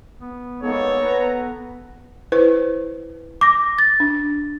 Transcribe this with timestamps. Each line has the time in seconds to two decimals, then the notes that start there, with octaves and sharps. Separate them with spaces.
0.20 B3
0.63 G#3 A#3 B3 D#4 A4 C#5
1.01 B3 B4 A#5
2.32 E4 B4 C5
3.41 D6 A#6
3.78 A6
4.00 D4